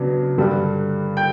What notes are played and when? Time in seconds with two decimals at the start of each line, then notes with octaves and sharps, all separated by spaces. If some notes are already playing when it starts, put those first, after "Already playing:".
Already playing: C#3 F#3 B3 D4
0.38 G2 D3 G3
1.17 G5 G6